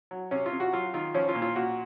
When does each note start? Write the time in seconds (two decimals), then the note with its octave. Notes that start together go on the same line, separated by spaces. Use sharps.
0.11 F#3
0.31 C3 C#4
0.46 F4
0.52 C3
0.60 F#4
0.73 F#3 F4
0.94 D#3 F4
1.14 F3 C#4
1.29 F4
1.35 A#2
1.42 F4
1.56 A#2 F#4